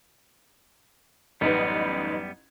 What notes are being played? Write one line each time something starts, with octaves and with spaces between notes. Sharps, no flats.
A1 F#2 G3 B3 D#4 B4